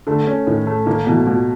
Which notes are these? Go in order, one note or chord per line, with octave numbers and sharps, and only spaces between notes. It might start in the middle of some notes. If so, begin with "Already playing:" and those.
D3 A3
C#4
A2 D#3
A3
D#3 A#3
B2 E3
B2 F3